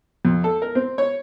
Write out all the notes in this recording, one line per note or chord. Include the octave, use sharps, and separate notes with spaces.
F2
A4
A#4
C4
C#5